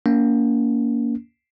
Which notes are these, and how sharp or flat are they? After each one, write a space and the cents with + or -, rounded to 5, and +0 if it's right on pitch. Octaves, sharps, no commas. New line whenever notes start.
A#3 +0 C#4 +40